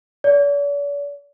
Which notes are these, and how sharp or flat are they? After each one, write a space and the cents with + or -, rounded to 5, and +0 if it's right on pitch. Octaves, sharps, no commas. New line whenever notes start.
D5 -45